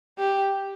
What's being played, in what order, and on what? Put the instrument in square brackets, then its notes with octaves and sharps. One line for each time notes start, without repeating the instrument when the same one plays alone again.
[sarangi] G4